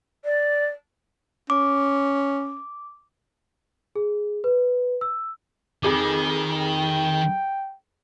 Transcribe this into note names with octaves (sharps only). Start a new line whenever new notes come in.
D5
C#4 D6
G#4
B4
E6
F2 D#3 G#4 D6
G5